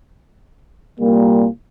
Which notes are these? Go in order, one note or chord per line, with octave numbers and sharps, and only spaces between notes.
C2 A#2 G3 A#3